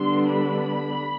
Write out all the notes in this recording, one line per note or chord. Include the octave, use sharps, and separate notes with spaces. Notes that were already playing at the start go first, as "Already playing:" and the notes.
Already playing: D3 G3 B3 D4 C6
B5